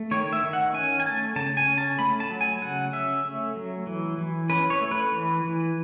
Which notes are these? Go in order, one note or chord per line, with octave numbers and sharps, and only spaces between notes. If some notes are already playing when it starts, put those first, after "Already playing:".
Already playing: A3
D#3 C#5
E5
D#3
F#5
C#4 G#5
G#5
A3 A5
C#3 A5
G#5
C#4
A5
A3 B5
A5
F#3
G#5
C#3 F#5
C#4 E5
A3
F#3
E3
E3
C#4 B4
C#5
A3
B4
E3
E3